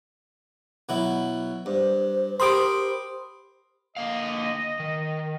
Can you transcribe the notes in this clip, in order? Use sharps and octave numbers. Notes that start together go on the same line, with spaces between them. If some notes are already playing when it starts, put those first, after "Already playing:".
B2 F#3 E4
G2 C5
G4 A#4 B5 C6 D#6 D7
D3 A#3 D#5 F5
D#3